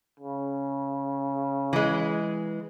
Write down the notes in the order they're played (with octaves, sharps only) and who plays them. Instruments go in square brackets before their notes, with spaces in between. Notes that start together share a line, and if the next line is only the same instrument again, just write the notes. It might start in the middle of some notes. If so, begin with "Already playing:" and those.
[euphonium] C#3
[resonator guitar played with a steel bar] E3 G#3